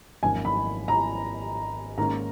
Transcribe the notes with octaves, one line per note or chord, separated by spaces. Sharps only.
G#1 F#2 F3 A#3 D#4 G#5
B5
A#5
G#2 D#3 A#3 C#4 A#5